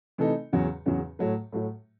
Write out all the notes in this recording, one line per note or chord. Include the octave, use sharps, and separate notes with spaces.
C3 E3 A3 D#4 A4
E2 C#3 F#3 C#4
E2 C#3 F#3 C#4
A2 F#3 A3
A2 F#3 A3